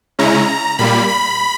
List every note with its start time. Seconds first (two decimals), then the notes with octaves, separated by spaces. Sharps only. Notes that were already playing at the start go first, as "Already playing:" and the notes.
0.19 C#3 G#3 C#4 E4 A#5
0.79 A#2 G3 A#3 B5
1.08 B5